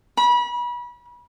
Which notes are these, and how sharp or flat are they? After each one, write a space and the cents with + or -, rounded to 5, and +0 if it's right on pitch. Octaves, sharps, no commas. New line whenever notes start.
B5 -30